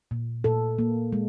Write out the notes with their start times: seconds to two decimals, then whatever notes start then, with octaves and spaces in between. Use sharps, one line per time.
0.11 A#2
0.44 A#2 A4
0.79 A#3
1.13 G#3